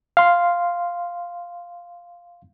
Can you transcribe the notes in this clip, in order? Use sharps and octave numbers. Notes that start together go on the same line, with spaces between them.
F5 C6